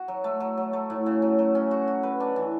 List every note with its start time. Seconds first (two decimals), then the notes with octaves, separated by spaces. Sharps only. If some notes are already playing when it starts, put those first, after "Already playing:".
Already playing: F#4
0.08 F#3
0.24 A3
0.40 F#3
0.57 F#3
0.73 A3
0.90 A2
1.06 C#3
1.22 F#3
1.39 F#3
1.55 C#4
1.71 F#4
1.88 F#4
2.03 B4
2.20 D4
2.36 E3